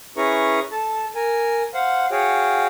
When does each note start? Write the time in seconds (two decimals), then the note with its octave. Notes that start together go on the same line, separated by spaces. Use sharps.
0.17 C#4 E4 G#4 B4 A#5 C#6
0.72 A4 A5
1.15 A#4 G#5
1.74 C5 F5 F#5
2.11 F#4 G#4 C#5 F5 G5